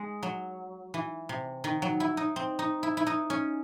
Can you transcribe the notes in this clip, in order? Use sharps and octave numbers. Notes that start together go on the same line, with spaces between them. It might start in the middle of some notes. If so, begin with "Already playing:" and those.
Already playing: G#3
F#3
E3
C3
D#3
F#3
E4
D#4
C4
D#4
E4
E4
D#4
C#4